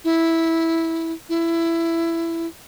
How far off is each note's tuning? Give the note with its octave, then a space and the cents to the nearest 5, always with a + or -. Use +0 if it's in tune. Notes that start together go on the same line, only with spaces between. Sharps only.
E4 -10
E4 +15